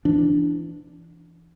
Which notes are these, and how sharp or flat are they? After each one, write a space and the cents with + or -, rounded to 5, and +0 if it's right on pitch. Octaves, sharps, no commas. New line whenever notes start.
E3 +25 D4 +0